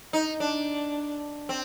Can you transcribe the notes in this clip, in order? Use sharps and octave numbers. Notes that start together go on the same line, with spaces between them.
D#4
D4
C4